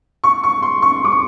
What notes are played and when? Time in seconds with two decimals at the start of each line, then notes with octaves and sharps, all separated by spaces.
0.24 C#6
0.44 C#6
0.62 C6
0.82 C#6
1.04 D6
1.12 C#6